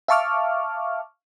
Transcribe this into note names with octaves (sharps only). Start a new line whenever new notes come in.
E5 F5 A5 C#6 D6 F6